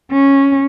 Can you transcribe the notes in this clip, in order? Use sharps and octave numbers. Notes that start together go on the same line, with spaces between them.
C#4